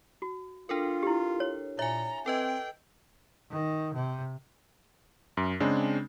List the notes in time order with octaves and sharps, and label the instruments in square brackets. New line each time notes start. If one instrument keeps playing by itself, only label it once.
[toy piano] F#4
[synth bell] D4 A4 A#4 [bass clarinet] F4
[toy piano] E4 G4
C#5
[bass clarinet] A#2 [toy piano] C#5 [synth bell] E5 G#5 [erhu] A#5
[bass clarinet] C4 [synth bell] A4 B4 D#5 [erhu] G5
[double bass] D#3
C3
[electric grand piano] F#2
C#3 G#3 C4 D4